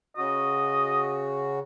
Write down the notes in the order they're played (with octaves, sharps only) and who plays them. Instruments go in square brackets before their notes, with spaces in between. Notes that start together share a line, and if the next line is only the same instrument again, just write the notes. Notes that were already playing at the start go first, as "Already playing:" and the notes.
[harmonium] C#3 F#4 [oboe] D#5